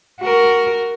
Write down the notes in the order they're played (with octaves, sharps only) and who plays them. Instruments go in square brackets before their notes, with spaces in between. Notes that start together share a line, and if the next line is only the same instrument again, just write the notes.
[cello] F#4 A#4